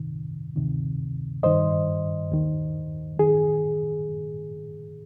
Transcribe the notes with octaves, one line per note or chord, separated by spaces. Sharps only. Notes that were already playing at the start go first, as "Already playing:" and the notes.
Already playing: C2 C3 D#3
D2 C3 D#3
G2 D#3 C5 D#5
D#2 D#3
D#3 G#4